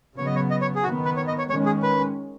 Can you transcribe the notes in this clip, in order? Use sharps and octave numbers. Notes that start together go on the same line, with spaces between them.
C#3 F#3 B3 C#5
D#5
C#5
D#5
C#5
G#4
D#3 B3 F#4
B4
C#5
D#5
C#5
D#3 G#3 C#4 C#5
G#4
B4